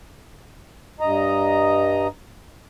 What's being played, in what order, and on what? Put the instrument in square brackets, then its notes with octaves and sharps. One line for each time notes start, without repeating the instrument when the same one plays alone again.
[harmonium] G2 D#5 A#5